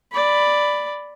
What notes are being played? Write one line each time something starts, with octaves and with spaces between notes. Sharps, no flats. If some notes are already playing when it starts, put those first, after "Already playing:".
D5 B5